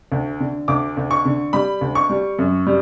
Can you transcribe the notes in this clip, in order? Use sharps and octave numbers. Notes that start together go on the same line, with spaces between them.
D2
D3
D2 D6
D2
C#6
D3
G3 B5
D2
C#6
G3
F#2
G3